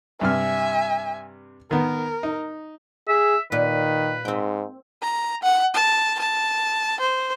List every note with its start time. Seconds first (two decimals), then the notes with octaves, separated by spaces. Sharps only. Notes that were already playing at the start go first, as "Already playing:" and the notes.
0.21 G2 C3 E5 G#5 F6
1.71 D#3 B3 A#4
2.23 D#4
3.08 G#4 E5
3.52 A#2 D#3 B4
4.25 G#2 C4 G5
5.02 A#5
5.43 F#5
5.74 A5
6.19 A5
7.00 C5